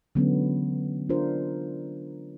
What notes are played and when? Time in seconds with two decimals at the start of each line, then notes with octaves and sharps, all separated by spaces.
0.15 D3 E3 F#3 G#3 B3 C#4
1.09 D4 F4 A#4 C5